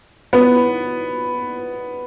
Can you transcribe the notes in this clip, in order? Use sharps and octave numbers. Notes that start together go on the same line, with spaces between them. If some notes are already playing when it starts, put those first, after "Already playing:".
B3